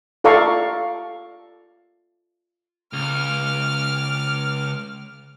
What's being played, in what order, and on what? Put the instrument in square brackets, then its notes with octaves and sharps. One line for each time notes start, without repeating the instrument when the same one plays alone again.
[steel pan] F4 A4 D5 F5 A#5 C#6
[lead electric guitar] C#2 [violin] D6 F6